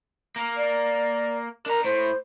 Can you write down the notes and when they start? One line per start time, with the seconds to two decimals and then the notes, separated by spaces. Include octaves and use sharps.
0.36 A#3 A#4
0.57 D5
1.66 D4 A#4 A#5
1.84 A2 C5